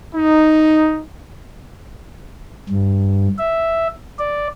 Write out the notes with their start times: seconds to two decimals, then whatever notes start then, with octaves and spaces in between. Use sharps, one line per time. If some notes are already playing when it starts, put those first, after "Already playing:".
0.15 D#4
2.69 G2
3.39 E5
4.19 D5